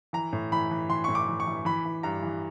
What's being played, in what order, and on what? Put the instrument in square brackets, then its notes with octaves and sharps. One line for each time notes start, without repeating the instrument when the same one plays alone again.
[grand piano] E3 A#5
A2
E3 B5
E3
E3 C6
A2 C#6
D6
E3
C#6
E3
E3 B5
E3
G2 A#5
E3